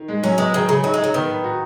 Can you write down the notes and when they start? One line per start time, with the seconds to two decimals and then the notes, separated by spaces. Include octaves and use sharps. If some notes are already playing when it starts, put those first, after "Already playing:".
Already playing: D#3
0.08 G#3
0.23 F#3 C#4
0.38 G#3 B3
0.53 D#3 G#4
0.68 C#3 G#4
0.84 F#3 D#4
0.94 G#3
0.98 D#4
1.04 F#3
1.14 D#3 B3
1.29 B4
1.44 F#4